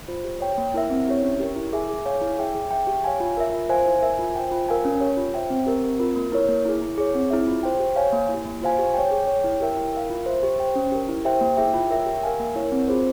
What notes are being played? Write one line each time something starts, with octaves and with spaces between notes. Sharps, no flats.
F4 C5
G4
C#5 G5
A#3
E4 A#4 E5
C4
E4 G4 C#5
C#4
G4 A#4
E4
G#4 E5 G#5
G#4
C#5 F5 G#5
E4
G#4 E5 G5
G#4
E5 G5
G4
C#5 F5 G#5
F4
A#4 E5
F4
C5 F5 G#5
E4
A#4 E5 G#5
F4
C5 G5
F4
A#4 F5 G#5
C#4
G4 C#5
F4
C5 E5 G5
C4
G4 A#4
C4
F4 A#4
A#3
E4 A#4 C#5
A#3
E4 G#4
E4
G#4 C#5
C4
E4 G#4 E5
F4
C5 G5
G4
C#5 F5 G#5
A#3
E4 G4
A#3
F4 C5 F5 G#5
G4
C#5 G5
G#4
C#5 G5
E4
G4 A#4 E5 G5
E4
A#4 F5
F4
C5 E5
G4
C5 G5
C#4
G4 A#4
E4
G4 C5 E5 G5
A#3
E4 G#4 E5 G5
F4
A#4 C#5 E5 G5
G4
A#4 F5 G#5
A#3
E4 A#4 C#5
C4
F4 G#4 C5